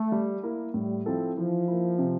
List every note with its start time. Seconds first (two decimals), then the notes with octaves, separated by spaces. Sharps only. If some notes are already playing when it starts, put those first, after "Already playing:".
Already playing: A3
0.12 G3
0.43 A#3 E4 A#4
0.74 A2 G3
1.06 F3 C4 E4 A4
1.36 E3 F3
1.68 A#3 E4
1.99 C3